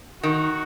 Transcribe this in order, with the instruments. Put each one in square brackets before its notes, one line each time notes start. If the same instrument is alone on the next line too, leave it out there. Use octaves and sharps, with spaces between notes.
[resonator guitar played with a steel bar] D#3 [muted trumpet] F#4